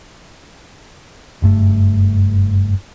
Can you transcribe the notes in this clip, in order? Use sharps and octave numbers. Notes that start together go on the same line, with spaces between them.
F#1 G2 A3